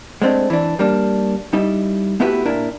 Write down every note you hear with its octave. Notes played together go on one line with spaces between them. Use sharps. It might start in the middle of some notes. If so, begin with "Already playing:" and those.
G#3 A3 C4 D4
E3 D4
G3 A#3 D4
G3 D#4 E4
A3 B3 E4 F#4 G4 B4
A#2 D4 E4 A#4